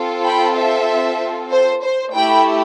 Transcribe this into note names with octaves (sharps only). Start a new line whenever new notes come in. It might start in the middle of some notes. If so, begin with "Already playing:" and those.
Already playing: C4 F4 A4
G5 B5
C5 E5
C5
C5
A3 E4 G4 G5 B5